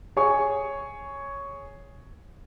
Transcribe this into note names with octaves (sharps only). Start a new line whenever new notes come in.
G#4 C#5 G#5 C#6